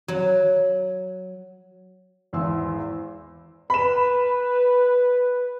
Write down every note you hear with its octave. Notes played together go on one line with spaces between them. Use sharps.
F#3
G#1 E2 G#5 C6 E6
B4 B5 E7